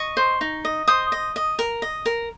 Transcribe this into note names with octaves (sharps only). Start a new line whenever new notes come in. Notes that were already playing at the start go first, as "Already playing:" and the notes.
Already playing: D#5 C#6
C5
D#4
D#5
C5 D#6
D#5
D#5
A#4
D#5
A#4